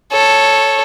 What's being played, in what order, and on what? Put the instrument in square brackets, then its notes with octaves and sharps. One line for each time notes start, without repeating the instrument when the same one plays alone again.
[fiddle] A4 C#5